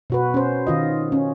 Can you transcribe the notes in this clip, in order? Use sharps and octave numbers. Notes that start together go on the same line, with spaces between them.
B2 F#4 B4
C#4 C5
D#3 F4 D#5
C#4